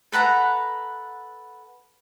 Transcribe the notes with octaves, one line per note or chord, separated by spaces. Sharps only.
A4 B4 F#5 A#5